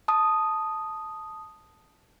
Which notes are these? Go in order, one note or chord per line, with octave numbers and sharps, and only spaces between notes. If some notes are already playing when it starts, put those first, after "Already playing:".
A5 D#6